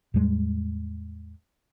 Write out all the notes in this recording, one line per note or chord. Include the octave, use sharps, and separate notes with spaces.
E2 A2 G3 G#3